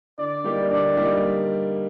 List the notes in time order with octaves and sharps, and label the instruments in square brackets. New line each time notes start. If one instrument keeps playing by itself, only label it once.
[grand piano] D3 [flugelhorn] D5
[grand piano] G3 A#3 D#4 G4
[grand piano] D3 [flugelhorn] D5
[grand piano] G3 A#3 D#4 G4